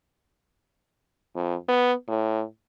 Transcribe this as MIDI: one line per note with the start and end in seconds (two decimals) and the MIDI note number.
1.35 1.55 41
1.68 1.93 59
2.08 2.43 45